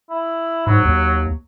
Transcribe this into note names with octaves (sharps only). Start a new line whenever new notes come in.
E4
G#2 F#3
D#2